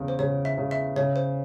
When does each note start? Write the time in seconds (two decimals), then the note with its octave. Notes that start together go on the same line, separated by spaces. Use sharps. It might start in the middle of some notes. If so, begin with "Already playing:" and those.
Already playing: E2 C#3
0.08 C5
0.19 C#3 C#5
0.45 E5
0.57 C#3
0.71 E5
0.96 C#3 C#5
1.16 C5